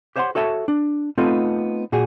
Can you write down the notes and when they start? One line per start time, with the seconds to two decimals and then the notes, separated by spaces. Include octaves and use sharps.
0.16 G4 C5 C#5 E5 F#5 C6
0.35 F#4 A4 C#5 E5 G5 A5
0.68 D4
1.18 A3 B3 C4 D#4 F4 A4
1.92 A#2 F#4 G#4